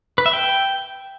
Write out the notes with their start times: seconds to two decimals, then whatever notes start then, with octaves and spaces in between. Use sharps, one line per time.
0.18 B4
0.26 E5
0.33 G5